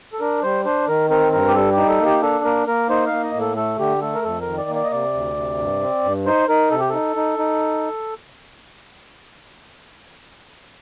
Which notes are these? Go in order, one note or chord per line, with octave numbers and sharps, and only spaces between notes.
A4
D4 A#4
G3 C5
D4 C5
D#3 A#4
C4 A#4
G2 A#4
G4
G3 A4
G4
D#4
A4
A#3
G4
D4 A4
A#3 A#4
A#3 A#4
D#4 C5
F5
A#3
D#5
A2
A4
A3 A4
D3 G4
A3 A4
A#4
F2 A4
A#4
D#3
D5
A#3
D5
D#5
C3 D5
D2
C3
G2
C4
G2
D#4 C5
D#4 A#4
C3 A4
G4
D#4 A4
D#4
D#4